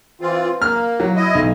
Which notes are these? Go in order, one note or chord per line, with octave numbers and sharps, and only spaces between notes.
E3 C4 F4
A#3 F6
F#3
E4 D#5
B1